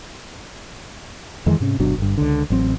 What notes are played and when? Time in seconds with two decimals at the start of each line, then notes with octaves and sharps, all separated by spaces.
1.46 F2 D#3 E3 G#3
1.60 G#2 C3 C#4
1.79 G1 B2 F#3 D4
1.98 G1 G2
2.18 C#2 D3
2.50 A1 F#3 C4